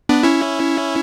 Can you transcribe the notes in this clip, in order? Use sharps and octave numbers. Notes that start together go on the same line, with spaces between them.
B3 D4
C#4 E4